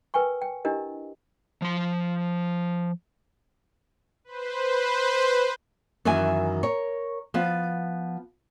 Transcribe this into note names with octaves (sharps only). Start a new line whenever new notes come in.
A#4 B4 G5 G#5 C#6
G5
D4 E4 G4 A#4 D#5
F3 C6
B4 C5
F#2 D#3 E3 E5 G#5
A#4 C#5
F3 B3